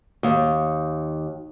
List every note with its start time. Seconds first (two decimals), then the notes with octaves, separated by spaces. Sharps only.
0.23 D#2